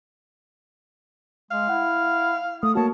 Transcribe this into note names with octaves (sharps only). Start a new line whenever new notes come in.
G#3 F5
E4 F#5
A3 D#6
A#3 F#4 C#5 A5